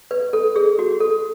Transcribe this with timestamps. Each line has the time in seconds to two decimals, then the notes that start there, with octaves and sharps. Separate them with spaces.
0.11 B4
0.33 A4
0.56 G#4
0.79 F#4
1.00 A4